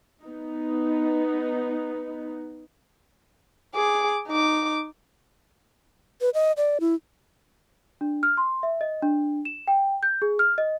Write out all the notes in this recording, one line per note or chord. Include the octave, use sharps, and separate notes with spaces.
B3 D#4
G#4 D6
D#4 D6
B4
D#5
D5
E4
D4
F6
C6
E5
D#5
D4
E7
G5
G6
G#4
F6
D#5